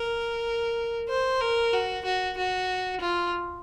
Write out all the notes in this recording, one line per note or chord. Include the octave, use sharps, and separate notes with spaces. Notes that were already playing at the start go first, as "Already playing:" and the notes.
Already playing: A#4
C5
A#4
F#4
F#4
F#4
F4